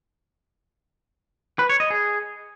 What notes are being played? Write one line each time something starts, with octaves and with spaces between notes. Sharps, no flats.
B4
C#5
D#5
G#4